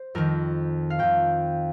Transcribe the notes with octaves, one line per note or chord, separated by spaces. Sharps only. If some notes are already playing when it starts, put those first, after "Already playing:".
Already playing: C5
F2 D#3 A#4
F5
F2 D#3 G5